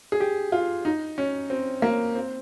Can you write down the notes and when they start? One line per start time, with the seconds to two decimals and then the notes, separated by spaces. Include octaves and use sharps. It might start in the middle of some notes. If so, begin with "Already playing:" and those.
0.12 G#4
0.20 G4
0.52 F4
0.85 D#4
1.18 C#4
1.50 C4
1.82 A#3
2.15 C4